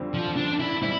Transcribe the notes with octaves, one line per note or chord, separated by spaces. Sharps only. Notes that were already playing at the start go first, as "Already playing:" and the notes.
Already playing: F2 D3 G3 C4
F3
D4
E4
G3 C4 E4